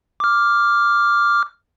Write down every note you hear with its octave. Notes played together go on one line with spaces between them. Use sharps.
D6 F6